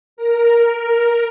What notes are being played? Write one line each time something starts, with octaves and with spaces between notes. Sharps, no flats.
A#4